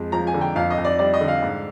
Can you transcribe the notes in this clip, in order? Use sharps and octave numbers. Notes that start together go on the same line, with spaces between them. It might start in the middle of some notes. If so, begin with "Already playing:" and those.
Already playing: F2 G#3
F3 A#5
G#5
D3
G5
F2 F5
D#5
F2
D5
G3 D5
D#5
D3
F5
G#2